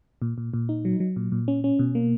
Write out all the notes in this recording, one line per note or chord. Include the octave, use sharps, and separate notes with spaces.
A#2
A#2
A#2
D#4
F#3
F#3
A#2
A#2
C#4
C#4
B2
A#3